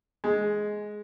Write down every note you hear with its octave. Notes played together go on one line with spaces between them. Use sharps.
G#3